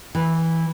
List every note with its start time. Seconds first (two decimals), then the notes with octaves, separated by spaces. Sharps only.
0.15 E3